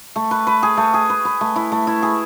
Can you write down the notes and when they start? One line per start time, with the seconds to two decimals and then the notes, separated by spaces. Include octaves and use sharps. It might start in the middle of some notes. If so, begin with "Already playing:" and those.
0.16 A3
0.31 B4
0.47 B4
0.63 G#4
0.77 A3
0.94 G#4
1.10 B4
1.25 B4
1.41 A3
1.56 E4
1.72 A3
1.87 E4
2.03 G#4